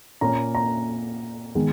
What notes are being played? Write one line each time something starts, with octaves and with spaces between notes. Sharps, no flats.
A#2 A#3 C#4 A#5
A#5
D#3 G#3 B3